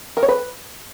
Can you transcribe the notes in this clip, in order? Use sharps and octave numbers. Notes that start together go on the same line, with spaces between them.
A#4
C#5
B4